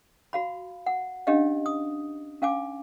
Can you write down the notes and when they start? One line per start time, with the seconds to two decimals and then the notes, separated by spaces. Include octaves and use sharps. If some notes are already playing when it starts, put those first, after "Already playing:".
0.33 F#4 F5 B5
0.86 F#5
1.27 C#4 D4 G4 D#5 F5
1.66 D#6
2.42 C#4 F5 G#5 D6